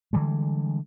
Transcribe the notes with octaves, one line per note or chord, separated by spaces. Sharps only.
D3 E3 G3 G#3